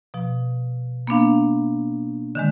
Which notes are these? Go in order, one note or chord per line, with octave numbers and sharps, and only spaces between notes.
B2 F3
A#3 B3 D4 F5
D3 D#3 G#3